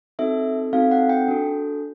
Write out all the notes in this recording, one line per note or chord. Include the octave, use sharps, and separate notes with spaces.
C4 D#4 F#4 A4 E5
C4 D#4 F#4 A4 F5
F#5
G5
D4 F#4 A4